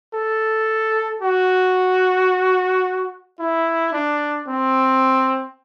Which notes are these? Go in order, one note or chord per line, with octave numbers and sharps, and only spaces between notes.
A4
F#4
E4
D4
C4